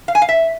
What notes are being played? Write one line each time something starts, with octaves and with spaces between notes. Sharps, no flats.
F5
G#5
F5
E5